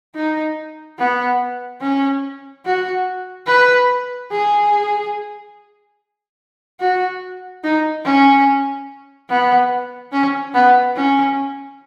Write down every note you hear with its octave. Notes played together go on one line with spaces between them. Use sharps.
D#4
B3
C#4
F#4
B4
G#4
F#4
D#4
C#4
B3
C#4
B3
C#4